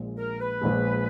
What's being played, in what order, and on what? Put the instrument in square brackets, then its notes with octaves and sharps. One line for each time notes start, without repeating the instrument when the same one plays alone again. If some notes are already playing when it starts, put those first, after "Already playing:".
Already playing: [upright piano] A#1 A#2 G#3
[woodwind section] A#4
B4
[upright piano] A#1 A#2 G#3